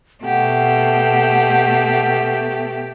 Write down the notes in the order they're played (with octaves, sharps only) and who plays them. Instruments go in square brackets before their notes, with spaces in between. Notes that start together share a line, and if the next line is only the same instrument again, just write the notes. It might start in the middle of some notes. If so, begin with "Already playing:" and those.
[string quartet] B2 A3 [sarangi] G4 [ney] F#5